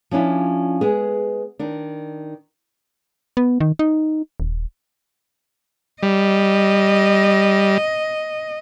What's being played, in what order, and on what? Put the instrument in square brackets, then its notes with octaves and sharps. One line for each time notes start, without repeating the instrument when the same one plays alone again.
[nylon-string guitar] F3 C#4 D4 E4 F4
G#3 B3 G#4
D#3 D4
[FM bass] B3
D#3
D#4
D#1
[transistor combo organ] G3 [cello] D#5